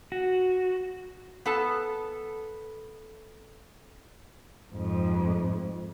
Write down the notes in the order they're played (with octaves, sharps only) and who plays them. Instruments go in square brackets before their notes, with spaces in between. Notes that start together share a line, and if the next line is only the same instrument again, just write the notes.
[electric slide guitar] F#4
[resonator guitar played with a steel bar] B3 A4 A5
[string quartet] F2 G#2